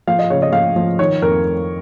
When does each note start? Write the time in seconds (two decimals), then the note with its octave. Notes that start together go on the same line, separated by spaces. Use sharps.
0.07 F3 F5
0.19 D#5
0.30 C#3 C#5
0.42 D#5
0.53 F3 F5
0.76 F3
0.99 D#3 C#5
1.22 F2 A#4